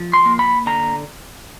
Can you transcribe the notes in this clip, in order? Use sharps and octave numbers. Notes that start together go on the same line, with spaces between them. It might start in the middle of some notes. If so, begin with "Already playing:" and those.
Already playing: F3
C6
A#3
B5
D3 A#5